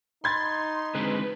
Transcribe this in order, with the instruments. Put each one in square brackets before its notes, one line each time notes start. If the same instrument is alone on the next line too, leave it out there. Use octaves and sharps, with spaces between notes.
[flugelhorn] D#4 [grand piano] B5 G#6 A6 [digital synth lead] C6
[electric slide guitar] D3 G#3 C4 [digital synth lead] B4